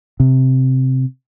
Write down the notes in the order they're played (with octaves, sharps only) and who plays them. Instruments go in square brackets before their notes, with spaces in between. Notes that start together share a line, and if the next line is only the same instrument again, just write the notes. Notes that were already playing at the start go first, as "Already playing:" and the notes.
[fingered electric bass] C3